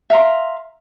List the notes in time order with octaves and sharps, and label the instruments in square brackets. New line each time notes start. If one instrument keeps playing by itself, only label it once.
[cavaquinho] E5 F5 A#5 C6